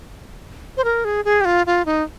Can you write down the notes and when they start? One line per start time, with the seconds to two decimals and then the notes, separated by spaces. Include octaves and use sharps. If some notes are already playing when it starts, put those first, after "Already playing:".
0.77 C5
0.84 A#4
1.05 G#4
1.25 G#4
1.41 G4
1.45 F4
1.66 F4
1.86 D#4